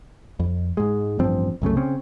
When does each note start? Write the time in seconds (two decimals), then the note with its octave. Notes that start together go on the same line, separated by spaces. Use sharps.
0.40 F2
0.77 G#2 G#3
1.19 A1 G2 F3 C4
1.62 C2 F#2 C#3 A3
1.77 C#3 C4 C#4